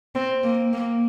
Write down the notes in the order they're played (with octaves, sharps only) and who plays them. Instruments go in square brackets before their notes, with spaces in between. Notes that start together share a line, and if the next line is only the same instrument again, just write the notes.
[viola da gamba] C4
A#3
A#3